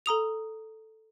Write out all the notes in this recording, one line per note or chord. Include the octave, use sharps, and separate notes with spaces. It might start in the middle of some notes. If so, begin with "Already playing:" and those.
A4 A#5 D#6 F7